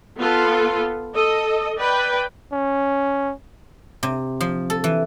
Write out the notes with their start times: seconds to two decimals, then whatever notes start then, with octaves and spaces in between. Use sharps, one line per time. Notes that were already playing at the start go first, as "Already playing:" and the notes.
0.18 B3 F4 A4 B4
1.15 A4 D#5
1.78 B4 D5 G5
2.53 C#4
4.03 C3
4.41 F3
4.70 A4
4.84 E3